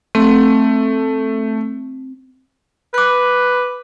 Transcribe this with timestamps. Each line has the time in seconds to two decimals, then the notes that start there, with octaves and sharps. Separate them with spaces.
0.15 A3 C4
2.94 B4 D6 F#6